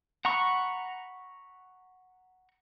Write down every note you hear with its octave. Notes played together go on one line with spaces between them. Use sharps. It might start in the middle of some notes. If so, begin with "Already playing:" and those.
F#5 A#5 B5 C#6